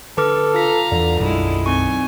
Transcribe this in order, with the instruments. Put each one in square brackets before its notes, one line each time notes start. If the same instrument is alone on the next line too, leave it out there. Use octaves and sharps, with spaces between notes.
[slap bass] D3 [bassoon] A4 [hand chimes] B4 D6 F6
[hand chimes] F4 B6 [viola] F5 A#5
[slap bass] E2 E3 [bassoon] D3
[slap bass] B1 F#2 G3 [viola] G#3 E4
[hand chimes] C4 D#4 C#6 [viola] G#5